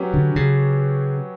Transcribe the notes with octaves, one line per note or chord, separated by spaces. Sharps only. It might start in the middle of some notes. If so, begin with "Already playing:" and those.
Already playing: F#3 C#4 G4 B4
D3
C#3